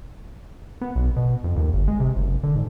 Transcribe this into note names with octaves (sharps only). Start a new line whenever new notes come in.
B3
B1
B2
F2
D#2
G1
G#3
C3
F#1
D3
G#2